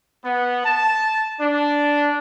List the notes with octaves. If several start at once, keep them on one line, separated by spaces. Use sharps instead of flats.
B3
A5
D4